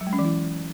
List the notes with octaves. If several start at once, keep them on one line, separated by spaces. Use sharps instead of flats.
F#3
G#3
C#4
E3
E4